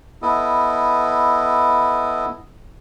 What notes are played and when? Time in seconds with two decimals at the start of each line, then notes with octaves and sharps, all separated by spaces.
0.22 B3 E4 A4 D#5